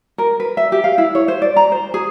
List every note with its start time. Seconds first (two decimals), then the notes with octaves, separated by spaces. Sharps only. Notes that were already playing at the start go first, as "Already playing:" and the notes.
0.18 A#4
0.40 B4
0.57 E5
0.72 G4
0.84 F5
0.98 E4
1.15 C#5
1.28 C5
1.42 D5
1.57 A#5
1.72 C5
1.94 G#4